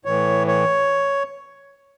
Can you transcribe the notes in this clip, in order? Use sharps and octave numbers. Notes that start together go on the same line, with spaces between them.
A2 E3 C#5
C#5